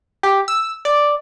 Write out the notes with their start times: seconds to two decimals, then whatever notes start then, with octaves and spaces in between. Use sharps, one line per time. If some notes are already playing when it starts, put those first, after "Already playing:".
0.23 G4
0.48 E6
0.85 D5